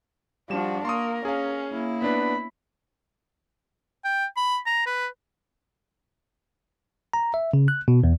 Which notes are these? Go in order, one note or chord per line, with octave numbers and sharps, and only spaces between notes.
F3 G3 D4 F#4 E7
A#3 A#4 C6 C#6 D#6
C#4 G#4 F5
A#3 E4
B3 D4 B4 B5
G5
B5
A#5
B4
A#5
E5
C#3
F#6
B2
E2